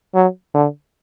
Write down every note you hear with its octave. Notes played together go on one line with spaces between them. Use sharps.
F#3
D3